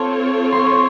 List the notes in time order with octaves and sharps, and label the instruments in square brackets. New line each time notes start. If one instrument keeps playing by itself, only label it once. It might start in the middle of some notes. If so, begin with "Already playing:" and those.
Already playing: [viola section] C4 F4 A4 C#5 [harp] A5 C6
[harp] C6
C#6
C6
C#6